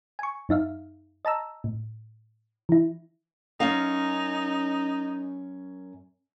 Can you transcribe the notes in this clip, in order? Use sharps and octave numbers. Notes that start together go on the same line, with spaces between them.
G#5 C#6
F#2 D#4 E5 F5
D#5 A5 A#5 E6
A2
E3 E4
F#2 C#4 D#4 F5